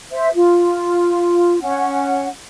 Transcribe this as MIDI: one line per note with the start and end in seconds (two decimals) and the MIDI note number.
0.12 0.29 72
0.12 0.29 76
0.35 1.59 65
1.61 2.28 61
1.61 2.28 78